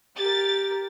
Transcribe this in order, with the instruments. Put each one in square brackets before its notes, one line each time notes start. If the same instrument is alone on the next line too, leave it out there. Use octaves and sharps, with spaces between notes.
[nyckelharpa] G4 A#4 [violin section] A6